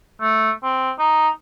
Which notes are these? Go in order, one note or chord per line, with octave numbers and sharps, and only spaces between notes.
A3
C4
D#4